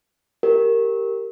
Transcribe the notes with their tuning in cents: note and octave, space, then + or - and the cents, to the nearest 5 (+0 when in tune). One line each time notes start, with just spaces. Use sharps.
G4 +0 A#4 -10